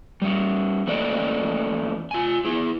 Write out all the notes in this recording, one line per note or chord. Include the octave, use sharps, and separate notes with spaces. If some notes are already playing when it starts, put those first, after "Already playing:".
G3 C#4
E3 A3 A#3 C#4 D5 D#5
F4 G#5
E4 G#4